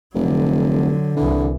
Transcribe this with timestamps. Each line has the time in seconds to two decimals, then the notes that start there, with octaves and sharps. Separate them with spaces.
0.15 F1 D3 F#3
1.16 C2 D3 E3